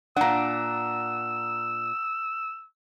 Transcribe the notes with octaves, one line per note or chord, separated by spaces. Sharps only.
A#2 D4 F#5 A#5 E6